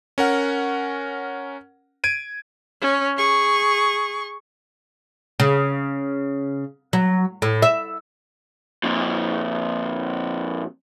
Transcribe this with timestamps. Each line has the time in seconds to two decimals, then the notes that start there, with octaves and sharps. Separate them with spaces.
0.18 C#4 A#4 F#5
2.04 G#6 D7 D#7
2.81 C#4
3.17 G#4 C#6
5.40 C#3
6.93 F#3
7.42 A2
7.62 E5
8.84 F2 A#2